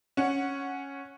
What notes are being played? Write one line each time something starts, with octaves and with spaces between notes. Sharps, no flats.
C#4 F#5